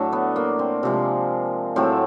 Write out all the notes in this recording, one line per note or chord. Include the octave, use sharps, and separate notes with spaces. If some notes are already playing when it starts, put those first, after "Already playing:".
Already playing: A2 F#3 A3 D4
B3
A#3
C4
C3 F3 G#3
A2 F#3 A3 C4